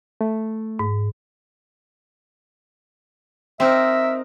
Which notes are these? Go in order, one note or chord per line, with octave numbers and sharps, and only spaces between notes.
A3
G#2
C4 D#4 A#4 E5